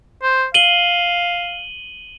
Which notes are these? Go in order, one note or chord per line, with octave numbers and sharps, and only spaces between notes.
C5
F5 D#7 F#7 G7